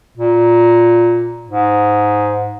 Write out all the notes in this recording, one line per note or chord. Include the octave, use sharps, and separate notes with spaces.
A#2
G#2